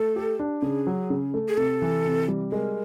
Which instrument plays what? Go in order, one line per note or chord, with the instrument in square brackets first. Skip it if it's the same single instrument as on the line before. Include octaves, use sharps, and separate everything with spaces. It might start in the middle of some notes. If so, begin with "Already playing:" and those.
Already playing: [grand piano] A3 [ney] A4
[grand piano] G4
D4
[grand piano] C#3 [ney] G#4
[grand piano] F#3
C#3
A3
[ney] G#4
[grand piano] C3 [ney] A4
[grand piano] E3
C3
G3
[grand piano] G#3 [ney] A#4